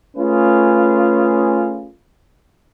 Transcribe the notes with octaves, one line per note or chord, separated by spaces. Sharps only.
A3 C#4 F4 G#4 B4